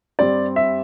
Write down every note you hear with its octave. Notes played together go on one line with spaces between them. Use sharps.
G2 G3 C4 D5
E5